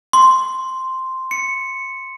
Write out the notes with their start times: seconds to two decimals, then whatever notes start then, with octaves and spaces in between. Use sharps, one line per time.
0.13 C6
1.31 C#7